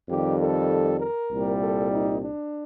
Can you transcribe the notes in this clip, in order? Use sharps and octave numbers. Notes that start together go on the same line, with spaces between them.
F2 D#3 G3 G4
A4
A#4
C2 A#2 G3
A4
D#4
D4